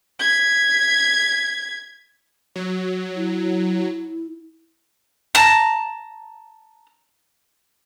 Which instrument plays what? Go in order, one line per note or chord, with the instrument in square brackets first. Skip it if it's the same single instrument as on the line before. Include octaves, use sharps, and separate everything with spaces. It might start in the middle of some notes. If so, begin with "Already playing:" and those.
[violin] G#6 B6
[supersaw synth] F#3
[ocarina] E4
[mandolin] A5 A#5